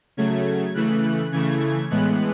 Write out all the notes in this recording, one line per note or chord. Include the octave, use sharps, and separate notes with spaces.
C#3 F#3 A3 G#6
C#3 E3 A3 F#6
C#3 E3 A3 G#6
A2 E3 G#3 B3 F#6